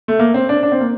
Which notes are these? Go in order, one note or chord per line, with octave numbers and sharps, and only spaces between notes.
A3
A#3
C4
D4
D4
C4
A#3